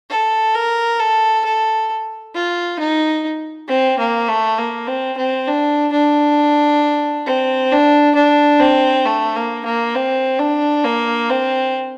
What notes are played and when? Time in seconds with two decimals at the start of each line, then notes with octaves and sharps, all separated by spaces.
0.10 A4
0.54 A#4
0.99 A4
1.45 A4
2.34 F4
2.79 D#4
3.68 C4
3.99 A#3
4.28 A3
4.58 A#3
4.87 C4
5.17 C4
5.47 D4
5.92 D4
7.27 C4
7.72 D4
8.15 D4
8.60 C4
9.06 A3
9.36 A#3
9.65 A#3
9.95 C4
10.39 D4
10.84 A#3
11.29 C4